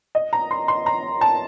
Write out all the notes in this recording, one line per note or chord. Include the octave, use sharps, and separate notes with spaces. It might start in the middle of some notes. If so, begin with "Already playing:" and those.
D#5
A#5
C6
C6
A#5
A5